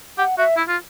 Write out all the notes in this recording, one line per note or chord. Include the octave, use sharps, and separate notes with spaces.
G4 F#5
F#4 E5
E4
F4